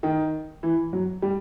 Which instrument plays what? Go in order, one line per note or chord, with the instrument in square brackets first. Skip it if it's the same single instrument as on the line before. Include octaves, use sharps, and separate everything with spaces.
[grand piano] D#3
E3
F#3
G3